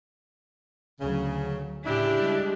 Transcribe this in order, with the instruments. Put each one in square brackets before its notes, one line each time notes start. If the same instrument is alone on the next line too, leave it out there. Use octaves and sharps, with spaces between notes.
[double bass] D2 F#3 [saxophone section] C#3
[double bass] A2 [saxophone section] C#3 E4 [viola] D4 G4
[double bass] G3 G#3